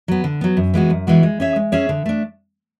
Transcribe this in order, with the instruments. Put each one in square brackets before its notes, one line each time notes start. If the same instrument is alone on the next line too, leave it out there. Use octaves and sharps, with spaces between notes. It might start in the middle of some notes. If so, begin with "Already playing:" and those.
[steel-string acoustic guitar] F#3 B3
D3
F#3 B3
F#2
E3 G#3 B3 F#4
F#2
E3 G#3 B3 F#4
G#3
C#4 G#4 C#5 E5
G#3
C#4 G#4 C#5 E5
D3
A3 D4